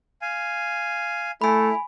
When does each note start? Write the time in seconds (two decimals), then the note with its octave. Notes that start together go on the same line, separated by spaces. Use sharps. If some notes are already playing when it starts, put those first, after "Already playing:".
0.22 F5 G#5
1.41 A3 E4 G#5 B5